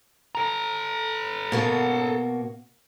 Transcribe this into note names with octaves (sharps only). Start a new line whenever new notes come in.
A4 A#5
B2 A#3 F#4